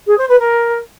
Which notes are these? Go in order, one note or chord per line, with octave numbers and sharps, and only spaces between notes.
G#4
C5
B4
A#4